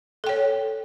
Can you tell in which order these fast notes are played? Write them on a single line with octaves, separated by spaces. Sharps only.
A4 G5 C#5